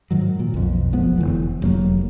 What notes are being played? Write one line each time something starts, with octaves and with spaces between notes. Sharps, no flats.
G#2 D#3 F#3
A#2
B1 F2
F#1 F3 G#3 B3
F1 A#1 D3 E3
F1 F#3 A#3